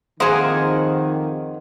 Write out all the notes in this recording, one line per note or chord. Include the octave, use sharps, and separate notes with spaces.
F2 D#3 A#3 G#4 C5 F#5 D#6